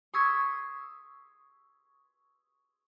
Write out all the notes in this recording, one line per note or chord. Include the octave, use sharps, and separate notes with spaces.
C6 C#6 D#6 E6 G#6 B6